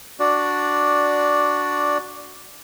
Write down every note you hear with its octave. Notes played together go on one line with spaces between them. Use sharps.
D4 F#4 D5